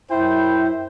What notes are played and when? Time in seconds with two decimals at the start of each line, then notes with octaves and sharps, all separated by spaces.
0.11 F#2 E4 C5 G5